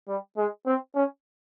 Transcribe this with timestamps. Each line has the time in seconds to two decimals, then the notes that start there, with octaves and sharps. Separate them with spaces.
0.08 G3
0.37 G#3
0.66 C4
0.95 C#4